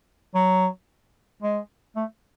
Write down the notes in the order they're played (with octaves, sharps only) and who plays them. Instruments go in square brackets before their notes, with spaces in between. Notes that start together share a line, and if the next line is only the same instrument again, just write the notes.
[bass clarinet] F#3
G#3
A3